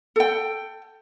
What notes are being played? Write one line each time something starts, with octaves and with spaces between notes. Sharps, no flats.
A4 G5